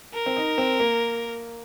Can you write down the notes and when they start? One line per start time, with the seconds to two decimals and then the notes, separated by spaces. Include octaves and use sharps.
0.15 A#4
0.26 C4
0.37 D#4
0.58 C4
0.80 A#3